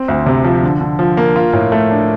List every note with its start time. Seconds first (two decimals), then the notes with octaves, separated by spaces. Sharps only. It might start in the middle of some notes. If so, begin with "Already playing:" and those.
Already playing: C4
0.08 D2
0.26 C3
0.44 F3
0.63 D3
0.81 D3
0.99 F3
1.17 A#3
1.36 F4
1.53 A2
1.72 A3
1.91 D4